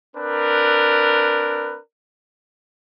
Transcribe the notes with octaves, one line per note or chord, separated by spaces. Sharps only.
C4 D4 A#4 B4